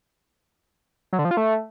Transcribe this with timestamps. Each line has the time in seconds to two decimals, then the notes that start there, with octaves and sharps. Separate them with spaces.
1.13 F#3
1.19 D3
1.25 F3
1.31 F4
1.37 A3